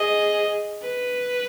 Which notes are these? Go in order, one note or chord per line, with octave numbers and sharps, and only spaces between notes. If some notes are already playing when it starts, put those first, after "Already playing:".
Already playing: G#4 D#5
B4